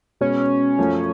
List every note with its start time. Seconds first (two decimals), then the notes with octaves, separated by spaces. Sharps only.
0.21 B2 G#3 B3 C#4
0.78 F#2 F3 A3